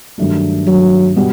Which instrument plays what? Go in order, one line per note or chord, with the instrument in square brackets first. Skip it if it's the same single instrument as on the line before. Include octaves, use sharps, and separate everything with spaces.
[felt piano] G2 D#3 F#3 A3 D4
[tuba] F#3
[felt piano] B2 G3 B3